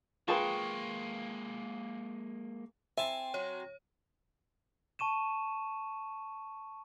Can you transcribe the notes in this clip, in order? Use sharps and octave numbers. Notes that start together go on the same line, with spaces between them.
G#3 A#3 F4 G#4 B4 G5 A5 C#6
C4 E5 G#5 A5
F#3 C4 F#4 C#5
A5 C#6 D#7 E7